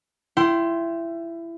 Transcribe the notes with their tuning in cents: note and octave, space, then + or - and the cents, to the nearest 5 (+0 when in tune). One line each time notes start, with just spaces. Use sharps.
E4 +25 G5 -15 C6 +0